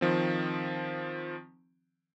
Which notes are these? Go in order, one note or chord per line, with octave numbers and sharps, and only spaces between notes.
D#3 F3 C4